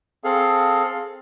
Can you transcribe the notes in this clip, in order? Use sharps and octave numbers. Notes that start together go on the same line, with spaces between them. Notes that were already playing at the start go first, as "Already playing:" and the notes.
C4 G#4 A4 F5